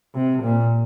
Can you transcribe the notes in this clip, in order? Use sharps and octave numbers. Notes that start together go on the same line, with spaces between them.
C3
A#2